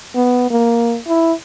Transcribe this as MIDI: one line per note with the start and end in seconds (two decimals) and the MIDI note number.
0.15 0.48 59
0.50 0.97 58
1.08 1.33 64